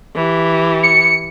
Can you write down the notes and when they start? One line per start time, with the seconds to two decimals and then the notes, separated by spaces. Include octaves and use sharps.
0.15 E3 G4
0.83 C#7